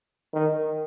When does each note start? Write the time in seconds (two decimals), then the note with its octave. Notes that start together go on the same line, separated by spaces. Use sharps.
0.34 D#3